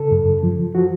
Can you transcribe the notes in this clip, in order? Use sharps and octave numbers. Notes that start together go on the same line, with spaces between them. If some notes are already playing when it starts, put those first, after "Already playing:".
Already playing: C#3 A4
F#2
F3
F3 F#4